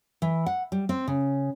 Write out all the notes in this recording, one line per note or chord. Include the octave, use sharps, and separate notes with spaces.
E3
F#5
G3
C4
C#3